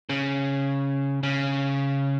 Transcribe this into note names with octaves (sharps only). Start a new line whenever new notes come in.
C#3
C#3